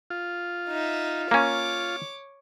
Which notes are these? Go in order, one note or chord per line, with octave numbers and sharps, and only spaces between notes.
F4
D#4 E5
A#3 C#4 C#5 D6